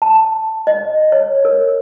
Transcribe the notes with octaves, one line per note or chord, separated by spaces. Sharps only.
A5
D#5
C#5
A#4